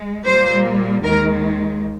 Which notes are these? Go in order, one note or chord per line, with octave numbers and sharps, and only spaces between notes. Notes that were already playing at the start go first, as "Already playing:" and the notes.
Already playing: G#3
A#2 G3 A#3 C5
D#2 D#3 G#3 A#4